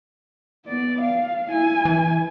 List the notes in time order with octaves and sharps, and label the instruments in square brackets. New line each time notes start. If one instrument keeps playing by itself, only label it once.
[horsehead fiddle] B3 D5
F5
E4 G#5
[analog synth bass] E3